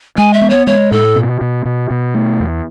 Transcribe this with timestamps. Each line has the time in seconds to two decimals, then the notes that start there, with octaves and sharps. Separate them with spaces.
0.18 G#3 G#5
0.33 E5
0.42 B3
0.50 C#5
0.67 G#3 C#5
0.91 A2 A4
1.16 B2
1.41 B2
1.65 B2
1.90 B2
2.15 A3
2.40 E2